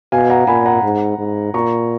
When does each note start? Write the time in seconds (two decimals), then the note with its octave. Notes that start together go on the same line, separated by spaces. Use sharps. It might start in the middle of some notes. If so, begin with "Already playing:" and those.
0.12 B2 F5 G#5
0.30 F#5 A#5
0.47 A#2 G#5 B5
0.66 F#5 A#5
0.83 G#2
1.18 G#2
1.54 A#2 A#5 C#6